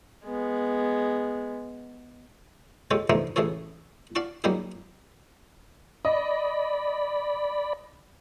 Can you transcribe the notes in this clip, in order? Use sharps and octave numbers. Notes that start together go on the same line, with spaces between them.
G#3 B3
G#3 F4 G4 A4 C#5
C3 E3 F3 A3 D4 D#4
A1 A2 E3 G#4 A4 C#5
D5 F5 F#5 A5 C#6
F#3 G3 A#3 D#4 G4 G#4
D5 D#5 B5